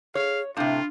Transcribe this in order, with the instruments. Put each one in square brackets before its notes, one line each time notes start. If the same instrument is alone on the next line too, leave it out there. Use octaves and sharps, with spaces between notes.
[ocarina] G#4 [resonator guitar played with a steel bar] C#5 [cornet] F5
[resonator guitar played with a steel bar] A2 C3 [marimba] D4 G6 [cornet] F4 [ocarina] F5